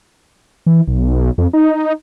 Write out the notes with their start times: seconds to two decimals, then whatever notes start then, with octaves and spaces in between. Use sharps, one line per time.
0.66 E3
0.88 B1
1.38 F2
1.53 D#4